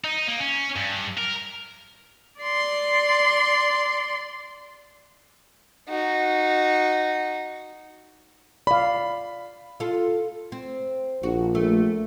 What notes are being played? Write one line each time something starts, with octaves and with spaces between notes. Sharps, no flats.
D#4
A#3
C#4
G2
A#4
D5 C6
D#4 F#4
D5 F5 B5
F4 A4
C4
A#1 F#4
A3